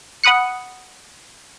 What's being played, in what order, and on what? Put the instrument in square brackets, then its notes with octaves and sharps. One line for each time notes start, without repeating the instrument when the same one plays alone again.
[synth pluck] F#5 B5 D#6 F#6 C#7